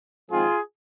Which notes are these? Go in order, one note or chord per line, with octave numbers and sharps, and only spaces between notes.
G#1 G#2 F3 C4 F4 G#4